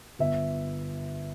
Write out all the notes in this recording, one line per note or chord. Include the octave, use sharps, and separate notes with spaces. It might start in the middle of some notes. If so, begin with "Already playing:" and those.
G1 E5